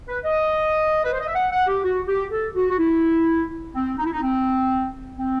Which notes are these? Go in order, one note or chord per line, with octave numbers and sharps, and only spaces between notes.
B4
D#5
B4
C5
D#5
E5
F#5
F#5
G4
F#4
G4
A4
F#4
F#4
E4
C4
D#4
E4
D#4
C4
C4